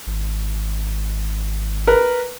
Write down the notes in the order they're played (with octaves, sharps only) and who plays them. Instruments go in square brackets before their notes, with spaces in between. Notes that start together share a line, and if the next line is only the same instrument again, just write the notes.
[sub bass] G#1
[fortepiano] A#4 B4